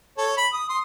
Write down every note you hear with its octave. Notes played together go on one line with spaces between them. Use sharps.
A4 C#5
B5
D#6
C6 D#6